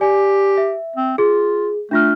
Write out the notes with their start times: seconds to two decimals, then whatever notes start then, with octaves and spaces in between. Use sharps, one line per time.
0.01 G4 D5 G#5
0.57 E5
0.96 C4
1.18 F4 G#4
1.91 A3 D4 F4 F6